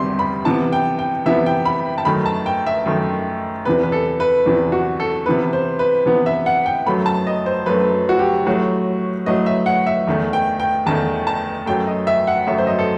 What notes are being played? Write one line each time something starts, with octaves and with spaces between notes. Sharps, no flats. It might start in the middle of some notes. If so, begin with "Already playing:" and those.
Already playing: E2 C3 D#3 G3 E5 C6
B5
C3 E3 B3 A5
G5
G5
C3 E3 B3 E5
G5
B5
A5
F#2 D#3 A3 B5
A5
G5
E5
F#2 D#3 A3
E2 C3 E3 B4
B4
A4
B4
E2 C3 E3
F#4
A4
C3 E3 B3 B4
C5
B4
C3 E3 B3
E5
F#5
G5
F#2 F#3 A3 B5
A5
D#5
C5
F#2 F#3 A3 B4
F#4
G4
A2 F#3 A3 F#4
A2 F#3 A3 D#5
E5
F#5
E5
E2 D#3 A3
G5
G5
E2 D#3 A3 A5
A5
F#2 F#3 A3 G5
D#5
E5
F#5
F#2 F#3 A3 E5
C5
D#5
A4